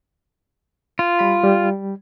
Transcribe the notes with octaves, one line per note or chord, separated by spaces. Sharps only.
F4
G3 B5
G3